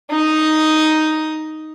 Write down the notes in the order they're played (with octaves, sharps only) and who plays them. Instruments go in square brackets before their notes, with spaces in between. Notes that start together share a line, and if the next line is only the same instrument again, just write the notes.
[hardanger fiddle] D#4 D#6